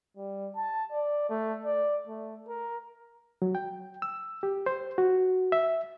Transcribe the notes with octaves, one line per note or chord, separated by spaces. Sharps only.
G3
A5
D5
A3
D5
A3
A#4
F#3
G5
E6
G4
C5
F#4
E5